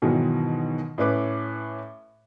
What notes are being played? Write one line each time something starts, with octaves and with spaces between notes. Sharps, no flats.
G#2 B2 D#3 E3 F#3
A2 C#4 B4 D6